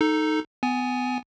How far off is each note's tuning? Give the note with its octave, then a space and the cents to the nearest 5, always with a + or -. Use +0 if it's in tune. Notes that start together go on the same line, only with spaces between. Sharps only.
D#4 +0 A4 +0
B3 +25 G#5 +0